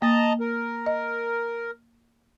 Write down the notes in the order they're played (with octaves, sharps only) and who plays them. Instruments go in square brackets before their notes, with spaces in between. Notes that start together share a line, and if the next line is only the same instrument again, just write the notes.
[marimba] A#3 [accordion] D#5 A5 A#5
[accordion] A#4
[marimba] D#5